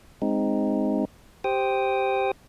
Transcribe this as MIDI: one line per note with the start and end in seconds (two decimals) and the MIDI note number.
0.22 1.05 56
0.22 1.05 60
0.22 1.05 63
1.44 2.31 67
1.44 2.31 72
1.44 2.31 79
1.44 2.31 87